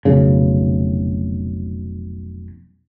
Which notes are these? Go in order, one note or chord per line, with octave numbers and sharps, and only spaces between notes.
F1 B1 C#3